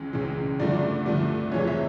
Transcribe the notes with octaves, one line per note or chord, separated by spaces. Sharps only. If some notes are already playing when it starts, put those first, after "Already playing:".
Already playing: C#2 C#3 E3 G#3
C#2 C#3 E3 G#3
G2 D3 F3 A3 D5
G2 D3 F3 A3
F2 C3 E3 G#3 C#5
E5